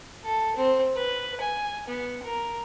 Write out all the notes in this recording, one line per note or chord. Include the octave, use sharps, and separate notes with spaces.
A4
C4
B4
G#5
B3
A#4